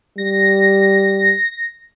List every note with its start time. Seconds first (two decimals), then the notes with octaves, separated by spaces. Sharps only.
0.18 G3 A#6